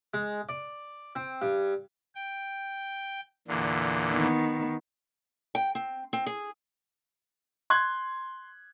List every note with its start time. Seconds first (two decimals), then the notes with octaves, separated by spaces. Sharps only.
0.14 G#3
0.49 D5
1.16 C4
1.42 G2
2.15 G5
3.48 E2 A#2 D3
4.11 D#3 B3
5.55 G5
5.75 C4
6.13 C4
6.26 G#4
7.70 C6 F#6 G#6